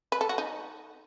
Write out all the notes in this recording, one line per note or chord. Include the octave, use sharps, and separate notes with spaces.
B4
A4
F#4
D#4